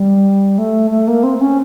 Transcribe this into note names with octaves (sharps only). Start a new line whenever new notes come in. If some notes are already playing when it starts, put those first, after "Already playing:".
Already playing: G3
A3
A3
A#3
C4
C#4